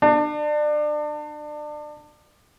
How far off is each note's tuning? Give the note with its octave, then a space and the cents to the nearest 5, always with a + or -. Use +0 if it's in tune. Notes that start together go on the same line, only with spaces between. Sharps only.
D4 +30